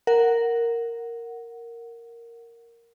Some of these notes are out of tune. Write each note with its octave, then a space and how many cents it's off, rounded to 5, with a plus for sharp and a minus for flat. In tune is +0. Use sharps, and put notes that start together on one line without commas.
A#4 -5 F#5 +0